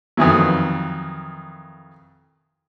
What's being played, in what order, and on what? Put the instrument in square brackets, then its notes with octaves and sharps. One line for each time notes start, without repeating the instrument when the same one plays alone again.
[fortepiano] F2 D#3 E3 F#3